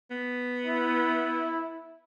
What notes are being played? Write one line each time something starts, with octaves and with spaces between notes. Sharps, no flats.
B3
E4